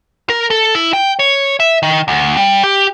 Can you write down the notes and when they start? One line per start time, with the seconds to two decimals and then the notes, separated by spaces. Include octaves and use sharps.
0.30 A#4
0.50 A4
0.75 E4
0.93 G5
1.19 C#5
1.60 E5
1.83 D#3
2.08 D2
2.37 G3
2.64 G4